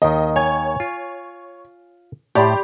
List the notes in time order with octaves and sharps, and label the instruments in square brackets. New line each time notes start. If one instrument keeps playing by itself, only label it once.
[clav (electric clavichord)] D#2 D#3 [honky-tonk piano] D#5
[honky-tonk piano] C#5 [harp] G#5
[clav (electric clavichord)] F4
[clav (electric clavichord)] A2 [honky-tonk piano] G4 [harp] D5 B5 C6